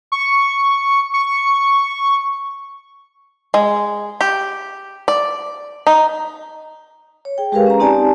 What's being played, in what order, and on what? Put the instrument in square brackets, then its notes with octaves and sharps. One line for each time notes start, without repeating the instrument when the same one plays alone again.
[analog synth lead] C#6
C#6
[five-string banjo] G#3
G4
D5
D#4
[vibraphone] C#5
G#4 G5
G#3 G4 G#4 A#4 B4 F5
C#4 A#5
C4 D#4 G4 D5 G#5 A5